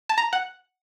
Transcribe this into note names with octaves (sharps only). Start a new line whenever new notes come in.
A5
A#5
F#5